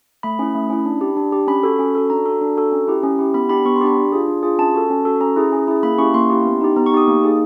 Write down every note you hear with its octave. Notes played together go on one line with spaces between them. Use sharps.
A3 B5
C#4 E4
A3
C#4 E4
D4
G4
D4
G4
C#4 B5
F#4 A4
C#4
F#4 A4
D4 A#5
F#4 A4
D4
F#4 A4
C#4
E4 G4
C#4
E4 G4
B3 B5
D4 G4 B5
B3 C#6
C6
D4 G4 B5
D4
F4 G#4
D4
F4 G#4
C#4 A5
F#4 A4
C#4
F#4 A4
C#4 A#5
E4 G#4
C#4
E4 G#4
A#3 B5
C#4 E4 G4 C#6
A#3 C6
C#4 E4 G4
B3
D#4 G4
B3 A#5
C#6
D#4 G4 D#6
A#3
D#4 G#4